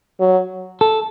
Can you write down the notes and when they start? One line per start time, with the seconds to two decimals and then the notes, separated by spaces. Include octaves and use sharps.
0.20 F#3
0.81 A4